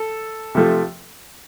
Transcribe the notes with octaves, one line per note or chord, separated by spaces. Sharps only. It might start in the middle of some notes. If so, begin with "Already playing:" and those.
Already playing: A4
C3 F3 A3